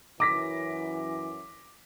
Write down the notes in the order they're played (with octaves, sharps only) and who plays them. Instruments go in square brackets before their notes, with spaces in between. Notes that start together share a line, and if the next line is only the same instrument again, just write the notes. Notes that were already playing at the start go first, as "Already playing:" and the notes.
[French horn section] F#2 E3 [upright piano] D6 A#6 B6